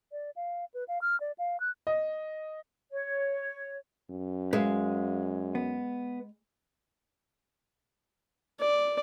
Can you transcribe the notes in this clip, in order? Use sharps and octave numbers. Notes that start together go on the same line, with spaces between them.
D5
F5
B4
F5
F6
D5
F5
F#6
D#5
C#5
F#2
G#3 B4 E5 F5
B3
D5